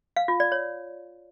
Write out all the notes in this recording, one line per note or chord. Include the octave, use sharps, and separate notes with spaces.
F5
F4
D5
C#5